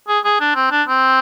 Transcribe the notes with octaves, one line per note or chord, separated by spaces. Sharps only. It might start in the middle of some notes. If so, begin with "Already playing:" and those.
G#4
G#4
D4
C4
D4
C4